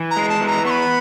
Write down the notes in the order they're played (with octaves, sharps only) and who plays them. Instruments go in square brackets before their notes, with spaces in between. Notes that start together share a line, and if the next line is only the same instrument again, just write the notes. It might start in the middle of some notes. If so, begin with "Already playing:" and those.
Already playing: [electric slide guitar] E3
[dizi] A#5
[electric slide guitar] G#3
[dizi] A5
[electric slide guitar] E3
[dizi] A#5
[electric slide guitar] B3 [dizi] C#6
[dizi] B5